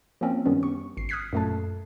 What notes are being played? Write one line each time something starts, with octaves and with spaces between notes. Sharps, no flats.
F3 A#3 C4 C#4
F#2 D#3 G3 B3 C#4 D4
C#6
G#1 C7
D#6 F6 F#6 G#6 B6 C7
F#2 A#2 A3 A4 A5